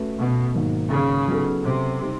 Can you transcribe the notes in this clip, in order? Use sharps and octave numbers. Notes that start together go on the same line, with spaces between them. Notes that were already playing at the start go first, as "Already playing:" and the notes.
Already playing: A3 C#4 F#4 B4
B2
G#2 D#3 F#3 A#3
C#3
F#3 B3 D#4 F#4 A4
C3
G3 C4 D#4